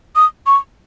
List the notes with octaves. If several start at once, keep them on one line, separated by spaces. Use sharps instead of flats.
D#6
C#6